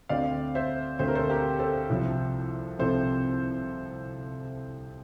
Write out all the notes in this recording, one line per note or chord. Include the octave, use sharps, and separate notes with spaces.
D2 D3 A3 C4 D5 F5
C5 E5
D2 D3 A3 C4 C5
A#4
A4 C5
G4 A#4
A4 C5
C2 C3 F3 C4 E4
C2 C3 F3 C4 E4 A4 C5